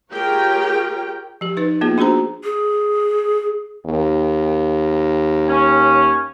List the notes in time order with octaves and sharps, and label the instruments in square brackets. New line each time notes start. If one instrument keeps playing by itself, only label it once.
[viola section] F4 G4 G#4 A#4 C#5 G5
[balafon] F3 G4
D#4 B4
A#3 B3 F4 G#4
D4 F#4 G#4 C5 A#5
[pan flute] G#4
[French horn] D#2
[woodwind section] C#4